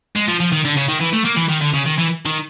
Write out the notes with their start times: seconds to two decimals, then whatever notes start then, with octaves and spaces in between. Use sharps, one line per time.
0.16 G#3
0.28 F3
0.40 F3
0.52 D#3
0.65 D3
0.77 C#3
0.88 D#3
1.01 E3
1.13 A3
1.25 A#3
1.37 E3
1.49 D#3
1.62 D3
1.74 C#3
1.86 D#3
1.99 E3
2.26 D#3